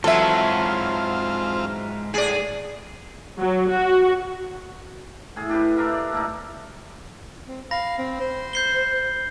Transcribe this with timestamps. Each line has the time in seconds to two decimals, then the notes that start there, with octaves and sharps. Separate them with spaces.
0.04 G#2 E3 F#3 C4 F4 A4 E5 A5
2.14 A2 G#4 D5
3.39 F#3
3.69 F#4
5.36 A2 G#4
5.49 D4 G4 B4
5.61 D#5
5.76 D4 A#4 E5 F5
5.93 D5
6.12 A#2 A3 D#4
7.47 C4
7.71 F5 B5 A#6
7.98 C4
8.20 C5
8.53 G6 C7 G7